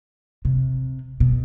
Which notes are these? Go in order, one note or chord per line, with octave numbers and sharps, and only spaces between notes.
C3
B2